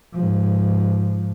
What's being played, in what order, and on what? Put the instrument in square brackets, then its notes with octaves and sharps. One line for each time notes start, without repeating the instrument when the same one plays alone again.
[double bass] G#2 F3